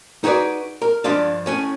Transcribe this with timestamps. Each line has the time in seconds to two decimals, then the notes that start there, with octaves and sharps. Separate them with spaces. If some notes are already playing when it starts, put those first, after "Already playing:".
0.24 D#4 F#4 G#4 B4 D5
0.82 A#4
1.04 G2 F3 G#3 D4 F5
1.46 A2 C#4 G#5